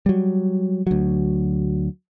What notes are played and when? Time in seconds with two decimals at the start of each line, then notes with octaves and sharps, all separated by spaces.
0.06 F#3 G3
0.87 D2 F#3